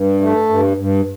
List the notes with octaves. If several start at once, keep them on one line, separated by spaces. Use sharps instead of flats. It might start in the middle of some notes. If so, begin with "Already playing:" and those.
Already playing: G2
A3
G2
G2